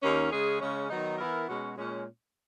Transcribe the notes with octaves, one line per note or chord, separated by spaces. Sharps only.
D#2 D#3 A#3 C#4
C#3 G#3 C#4 G#4
C#3 G#3 C#4
D#3 F#3 B3 D#4
E3 B3 E4 A#4
B2 G#3 C#4 F#4
A#2 G#3 C#4